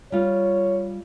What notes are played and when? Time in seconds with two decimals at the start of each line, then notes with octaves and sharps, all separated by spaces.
0.12 G3 F4 C#5